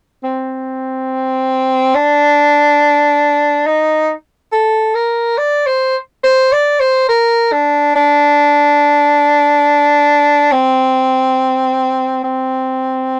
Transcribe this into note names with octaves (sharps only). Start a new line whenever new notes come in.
C4
D4
D#4
A4
A#4
D5
C5
C5
D5
C5
A#4
D4
D4
C4
C4